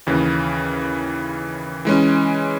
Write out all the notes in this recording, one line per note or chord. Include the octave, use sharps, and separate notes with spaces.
D#2 C#3 E3
E3 G#3 C#4